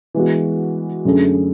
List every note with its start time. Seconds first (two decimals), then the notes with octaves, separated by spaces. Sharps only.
0.14 E3 G#3 B3 F#4
1.05 F#2 D3 A3 C#4 G#4